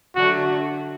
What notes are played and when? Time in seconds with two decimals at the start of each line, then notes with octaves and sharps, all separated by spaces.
0.15 D3 F#3 A3 D4 F#4